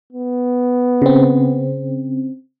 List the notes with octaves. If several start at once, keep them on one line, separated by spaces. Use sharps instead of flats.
B3
C#3 C4